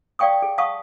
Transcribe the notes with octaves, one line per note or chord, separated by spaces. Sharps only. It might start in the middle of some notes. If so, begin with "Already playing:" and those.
D5 F5 G5 C#6 D#6
G#4
F5 F#5 A5 C#6 D#6